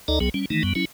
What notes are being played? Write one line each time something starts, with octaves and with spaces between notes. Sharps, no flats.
D2 D#4 A4 D5 D#5 A#5
C2 F#3 B3 G#4
G3 C#4
D#3 E3 A3 D#4
F#2 G3 B3
F#3 C#4 E4